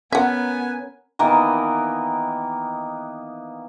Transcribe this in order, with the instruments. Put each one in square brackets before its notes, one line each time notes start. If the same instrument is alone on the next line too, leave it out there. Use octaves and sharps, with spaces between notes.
[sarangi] B3 [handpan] C#4 A#4 [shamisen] E5 F#5 [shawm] G#5
[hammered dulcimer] D#3 E3 A#3 B3